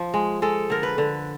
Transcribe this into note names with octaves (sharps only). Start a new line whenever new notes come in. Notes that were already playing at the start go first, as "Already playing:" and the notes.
Already playing: F3
G#3
G#3 A4
D3 A#4
B4
D3